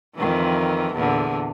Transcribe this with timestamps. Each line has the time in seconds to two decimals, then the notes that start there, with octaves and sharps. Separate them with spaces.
0.15 F2 D#3 E3
0.94 E2 A#2 D3